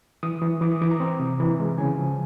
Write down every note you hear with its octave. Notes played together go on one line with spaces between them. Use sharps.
E3 D#6
E3
E3 D6
D#6
E3 D6
A#5
C4
C3
E3
G#3
C#3 G#5
F3